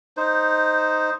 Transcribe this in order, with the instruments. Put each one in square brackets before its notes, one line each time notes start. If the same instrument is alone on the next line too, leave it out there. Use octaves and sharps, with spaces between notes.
[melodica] D#4 C5